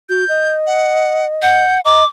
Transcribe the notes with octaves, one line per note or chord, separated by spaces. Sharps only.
F#4 G6
D#5
F#5
F#5 G6
D#5 A#5 D6